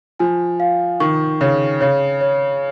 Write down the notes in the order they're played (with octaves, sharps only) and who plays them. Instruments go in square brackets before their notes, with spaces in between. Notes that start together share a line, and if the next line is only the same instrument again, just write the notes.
[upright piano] F3 [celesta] G#5
[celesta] F5
[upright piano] D#3 [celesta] C#6
[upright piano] C#3 [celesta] C#5
[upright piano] C#3 [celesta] C#5
[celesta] C#5